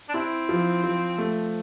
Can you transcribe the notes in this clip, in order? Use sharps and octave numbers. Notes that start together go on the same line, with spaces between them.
D4
C4 E4
F3
F3
A3